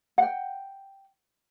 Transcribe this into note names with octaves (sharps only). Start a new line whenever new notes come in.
F#5 G5